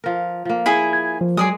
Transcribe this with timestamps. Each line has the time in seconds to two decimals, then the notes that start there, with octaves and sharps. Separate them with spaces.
0.04 F3 A#4
0.45 F3 A#3
0.66 E4 G#4 G#5
0.93 G#6
1.21 F3
1.37 F#3 G#3 G#4 D5 D#6